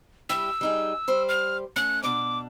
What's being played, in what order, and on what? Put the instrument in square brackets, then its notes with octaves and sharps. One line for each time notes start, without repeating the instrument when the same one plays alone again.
[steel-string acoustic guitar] G3 E4 G4 [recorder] E6
[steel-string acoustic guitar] G3 D#4 G#4
G3 C5
[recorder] F6
[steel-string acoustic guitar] A3 C#4 [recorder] F#6
[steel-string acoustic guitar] B2 D4 [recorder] D6